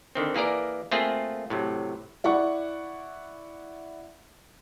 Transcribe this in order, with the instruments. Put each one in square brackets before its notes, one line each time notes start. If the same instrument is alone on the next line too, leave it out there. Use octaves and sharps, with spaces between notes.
[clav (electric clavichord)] D3 D#3 C4
E3 A#3 G#4 A#4 D5
A3 A#3 C4 F4 G#4
A2 C3 F#3
[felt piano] E4 D5 F#5 C#6